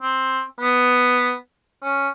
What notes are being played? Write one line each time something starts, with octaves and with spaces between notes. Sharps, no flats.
C4
B3
C#4